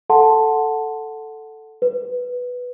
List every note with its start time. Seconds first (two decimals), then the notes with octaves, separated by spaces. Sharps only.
0.10 A4 F#5 A5 C6
1.82 B4